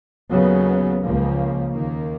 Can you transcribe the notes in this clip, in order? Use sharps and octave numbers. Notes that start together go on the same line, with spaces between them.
D#2 C#3 F#3 B3
C#2 C#3 F3 A#3
D#2 D#3 A#3